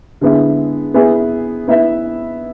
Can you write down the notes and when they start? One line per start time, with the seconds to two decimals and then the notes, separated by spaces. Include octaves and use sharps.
0.21 D3 G#3 B3 E4
0.94 B3 E4 G#4 B4
1.68 B3 E4 B4 E5